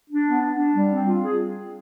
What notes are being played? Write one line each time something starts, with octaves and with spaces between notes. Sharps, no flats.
D4
B3
D4
D4
G3
C4
F4
G#4